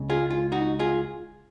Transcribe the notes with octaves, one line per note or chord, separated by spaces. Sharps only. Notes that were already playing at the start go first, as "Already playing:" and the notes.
Already playing: C#2 C#3 G#3
F4 G#4
F4
D#4 F#4
F4 G#4